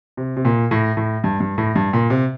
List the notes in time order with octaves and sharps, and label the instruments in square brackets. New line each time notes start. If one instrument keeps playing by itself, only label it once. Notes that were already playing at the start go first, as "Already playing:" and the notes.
[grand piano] C3
C3
A#2
A2
A2
G2
G2
A2
G2
A#2
C3